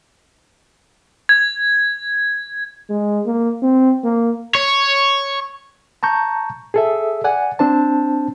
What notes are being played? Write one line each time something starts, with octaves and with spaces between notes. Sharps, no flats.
G#6
G#3
A#3
C4
A#3
C#5
A5 A#5 C#6 G6
G#4 A4 E5
D5 F#5 G#5
C4 D4 C5 A5